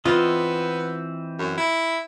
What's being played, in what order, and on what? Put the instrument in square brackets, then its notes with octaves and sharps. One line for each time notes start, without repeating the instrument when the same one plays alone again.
[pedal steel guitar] E3 C4 D#5 [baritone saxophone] B3 [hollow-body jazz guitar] F4
[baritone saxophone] F#2
E4